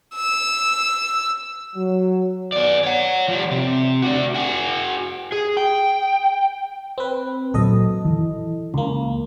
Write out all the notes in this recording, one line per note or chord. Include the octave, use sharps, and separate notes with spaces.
E6
F#3
B3 D5
C#5 F#5
F3 G3
C3
D4 F#4
F#4 G#4
G#4
G5
C4 B4
A#2 F#3 A4 D#5
E3
C#2 A#3